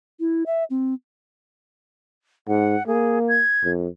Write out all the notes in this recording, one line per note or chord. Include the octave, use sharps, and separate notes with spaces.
E4
E5
C4
G#2 F#5
A#3 G#4
G#6
F2